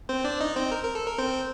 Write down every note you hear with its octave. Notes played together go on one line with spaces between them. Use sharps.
C4 C5
D4 D5
D#4 D#5
C4 C5
A#4
A#4
A4
A#4
C4 C5